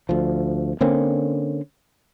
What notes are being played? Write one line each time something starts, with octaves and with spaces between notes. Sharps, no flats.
D2 F3
D3 A#3 C4 C#4